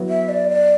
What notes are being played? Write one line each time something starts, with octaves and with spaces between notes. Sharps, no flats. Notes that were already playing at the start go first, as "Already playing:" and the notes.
Already playing: F#3 B3 E4 B4
E5
D5
D5